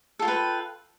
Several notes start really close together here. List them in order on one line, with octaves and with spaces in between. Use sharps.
A4 F4 G5 B4